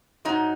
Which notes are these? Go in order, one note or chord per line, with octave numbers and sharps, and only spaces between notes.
G#2 F#3 D#4